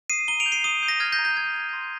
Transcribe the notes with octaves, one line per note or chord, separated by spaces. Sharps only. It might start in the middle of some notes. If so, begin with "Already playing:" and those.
D#6 C7 D#7
A#5 D#7 G7
D7 F7
G6
C7 D#7
D#6 D#7 G7
G6
A#6
F6 G#6
G6 A#6
A#5
G6 A#6
G6 G#6
G6
C6